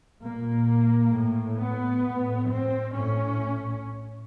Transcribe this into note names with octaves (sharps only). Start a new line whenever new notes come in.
A#2 A#3
A2
B3
A2
C4
A2 C#4